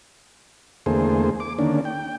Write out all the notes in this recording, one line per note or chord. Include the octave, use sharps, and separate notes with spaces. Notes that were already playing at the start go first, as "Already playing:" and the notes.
E2 D3 A3 A#3 G#4 C5
D6
D3 D#3 A#3 C#4 D4
G5